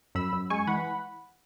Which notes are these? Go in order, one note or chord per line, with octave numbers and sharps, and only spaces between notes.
F#2 B5 E6
F#2
G#3 G#5 C#6
E3 F#5 B5